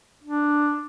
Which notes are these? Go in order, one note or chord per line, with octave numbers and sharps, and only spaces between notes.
D4